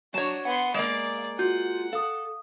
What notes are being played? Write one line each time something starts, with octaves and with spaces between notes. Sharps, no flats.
F#3 D4 F#4 C#5 A5
B3 F#5 C6
G#3 A#3 D5 F5
F4 F#4 F#5 G6
A4 F5 D#6